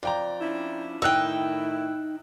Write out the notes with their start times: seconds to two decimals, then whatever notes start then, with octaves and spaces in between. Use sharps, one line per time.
0.03 F2 D5 G5 A#5
0.41 C#4 D4 E4
1.02 A2 D#3 D#4 E4 G5 E6 F#6